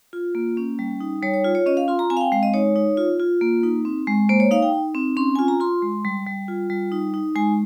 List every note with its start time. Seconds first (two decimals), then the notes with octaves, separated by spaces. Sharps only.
0.13 F4
0.35 A#3
0.57 C#4
0.79 G3
1.00 D#4
1.23 G3 C#5
1.34 C#5
1.44 F4
1.55 C#5
1.66 C#4 D#5
1.77 F5
1.88 F4 C6
1.99 A#5
2.10 C4 G#5
2.17 F5
2.21 G5
2.32 G#3 F5
2.43 D#5
2.54 D#4 C#5
2.76 D#4
2.97 F4
3.20 F4
3.41 A#3
3.63 D#4
3.85 C4
4.07 G#3
4.29 A#3 C5
4.40 C#5
4.51 D#4 F5
4.62 G5
4.73 D#4
4.95 C4
5.17 C#4 C6
5.36 F4 G#5
5.48 A#5
5.60 F4 C6
5.82 G#3
6.05 G3
6.26 G3
6.48 F4
6.70 G3
6.92 D#4
7.14 D#4
7.36 G#3 G#5